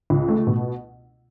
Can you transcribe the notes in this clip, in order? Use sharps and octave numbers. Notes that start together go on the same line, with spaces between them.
C#2
A3
B2